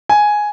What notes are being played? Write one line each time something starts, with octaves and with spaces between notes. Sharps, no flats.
G#5